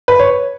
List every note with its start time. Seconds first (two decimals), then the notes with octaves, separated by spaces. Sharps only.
0.08 B4
0.19 C#5